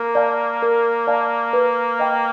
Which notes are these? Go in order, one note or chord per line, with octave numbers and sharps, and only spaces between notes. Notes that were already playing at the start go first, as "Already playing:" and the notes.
Already playing: A#3 A#4
D5 F5 A5
A#4
D5 F5 A5
B4
D#5 G5 B5